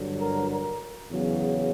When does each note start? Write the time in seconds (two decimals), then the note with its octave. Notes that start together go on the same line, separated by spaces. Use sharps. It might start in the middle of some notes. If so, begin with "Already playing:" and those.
Already playing: G2 D3 F#3
0.20 A#4
0.50 A#4
1.10 E2 C#3 F#3